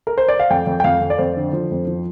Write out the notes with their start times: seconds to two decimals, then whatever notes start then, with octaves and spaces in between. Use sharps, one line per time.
0.07 A#4
0.18 C5
0.28 D5
0.40 F5
0.50 F2 G5
0.67 F2
0.80 G5
0.84 F2 F5
1.01 F2
1.10 D5
1.18 F2 C5
1.37 D3
1.53 F3
1.71 F2
1.87 F3